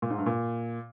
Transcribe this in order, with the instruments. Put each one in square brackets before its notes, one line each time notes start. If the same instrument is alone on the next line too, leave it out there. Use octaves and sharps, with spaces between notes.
[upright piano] A#2
G#2
G2
A#2